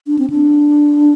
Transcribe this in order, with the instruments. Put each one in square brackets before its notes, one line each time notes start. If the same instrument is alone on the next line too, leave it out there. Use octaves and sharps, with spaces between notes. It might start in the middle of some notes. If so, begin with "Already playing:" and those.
[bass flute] D4
C4
D4